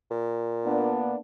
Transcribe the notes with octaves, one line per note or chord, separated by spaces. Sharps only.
A#2
A#3 B3 D4